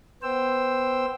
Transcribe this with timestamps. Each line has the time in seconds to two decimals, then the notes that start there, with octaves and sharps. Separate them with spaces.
0.22 B3 C5 G5 E6